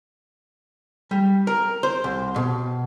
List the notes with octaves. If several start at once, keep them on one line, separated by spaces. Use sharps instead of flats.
G3
A#4
C5
C2
B2